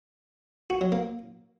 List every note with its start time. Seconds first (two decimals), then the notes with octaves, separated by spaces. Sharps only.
0.70 F#4
0.81 F#3
0.92 A#3